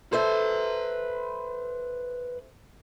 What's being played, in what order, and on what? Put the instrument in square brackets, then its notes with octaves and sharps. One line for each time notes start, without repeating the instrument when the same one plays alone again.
[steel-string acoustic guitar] A4 C5 E5 [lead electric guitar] B4 C6